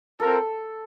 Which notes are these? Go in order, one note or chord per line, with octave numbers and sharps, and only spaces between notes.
C4 F4 A4 A#4